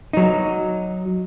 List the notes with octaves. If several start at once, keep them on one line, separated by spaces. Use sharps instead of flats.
F#3 D#4